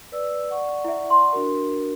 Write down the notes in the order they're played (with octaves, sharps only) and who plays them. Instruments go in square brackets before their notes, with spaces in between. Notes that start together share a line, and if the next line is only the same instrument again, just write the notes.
[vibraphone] B4 D5 E6
D5 F#5 C#6
[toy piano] E4 E5
C6
[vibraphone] D4 F#4 A#4